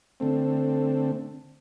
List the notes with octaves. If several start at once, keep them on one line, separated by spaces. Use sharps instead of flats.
D3 A3 C4